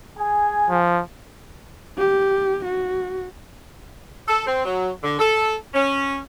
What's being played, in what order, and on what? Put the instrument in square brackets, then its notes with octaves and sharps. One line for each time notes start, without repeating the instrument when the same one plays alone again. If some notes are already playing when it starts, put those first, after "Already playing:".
[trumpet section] G#4 G#5
[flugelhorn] F3
[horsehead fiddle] G4
F#4
[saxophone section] A4
C4
F#3
D3
A4
C#4